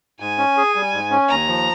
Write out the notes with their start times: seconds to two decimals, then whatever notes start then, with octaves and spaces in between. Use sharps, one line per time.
0.20 G#2 G#5
0.38 C#4
0.57 G#4
0.75 G3
0.93 G#2
1.11 C#4
1.29 D#2 A#5
1.47 F3